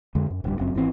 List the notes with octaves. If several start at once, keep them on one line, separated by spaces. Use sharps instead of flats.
F2 D3 G#3
F#2
D1 G2 G3
F#1 F#2 C4
G#1 E3 F3 C4